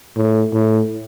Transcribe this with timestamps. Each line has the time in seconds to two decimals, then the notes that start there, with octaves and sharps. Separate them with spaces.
0.16 A2
0.53 A2